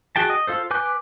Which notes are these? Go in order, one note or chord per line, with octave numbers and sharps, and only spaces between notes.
F#4 G#4 G5 A5
D#5
F4 A4 C5
B4 G#5 D6 G6